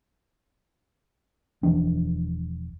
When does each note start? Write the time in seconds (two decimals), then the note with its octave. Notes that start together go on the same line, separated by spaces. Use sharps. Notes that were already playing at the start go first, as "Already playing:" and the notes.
1.63 E1 E3 F3 D4